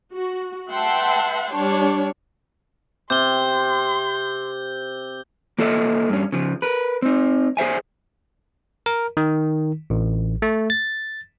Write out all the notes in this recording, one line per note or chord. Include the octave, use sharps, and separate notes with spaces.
F#4
B4 E5 F#5 G5 A5 C6
G3 D4 C#5
C3 C6 G6 G7
A#3 F4 A4 D#5 E5
G2 C#4
C#3 F3
A#4 B4
C4 D#4
G#4 C5 E5 G#5
A#4
D#3
A1
A3
A6